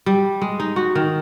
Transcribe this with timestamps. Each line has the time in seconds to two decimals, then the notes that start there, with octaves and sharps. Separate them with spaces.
0.06 G3
0.42 G#3
0.60 D#4
0.76 F#4
0.95 D#3